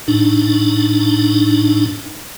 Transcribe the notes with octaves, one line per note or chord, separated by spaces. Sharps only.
A2 D4 D#4